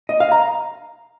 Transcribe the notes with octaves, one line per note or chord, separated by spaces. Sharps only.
D#5
F5
A#5